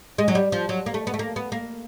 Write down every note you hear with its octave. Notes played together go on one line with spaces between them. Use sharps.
G#3
F#3
G3
F3
F#3
A#3
A3
B3
A3
A#3
B3
A#3